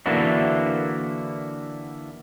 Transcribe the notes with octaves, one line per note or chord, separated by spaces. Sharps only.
D3 E3 A#3 D4 E4 F#4